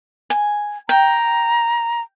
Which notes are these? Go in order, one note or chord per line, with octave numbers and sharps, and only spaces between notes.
G#5
G5 A#5